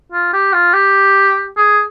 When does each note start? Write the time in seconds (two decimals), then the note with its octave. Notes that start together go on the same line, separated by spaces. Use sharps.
0.12 F4
0.33 G4
0.54 F4
0.74 G4
1.57 G#4